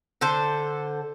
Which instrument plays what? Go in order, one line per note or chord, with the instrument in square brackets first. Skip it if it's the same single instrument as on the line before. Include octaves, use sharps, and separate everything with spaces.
[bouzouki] D3 A4 C5